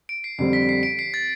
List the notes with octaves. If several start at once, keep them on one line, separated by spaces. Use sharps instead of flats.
D7
C7
F2 D3 G3 C4 C7
B6
C7
D7
C7
A6